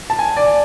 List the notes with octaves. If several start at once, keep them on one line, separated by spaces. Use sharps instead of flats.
A5
G#5
D5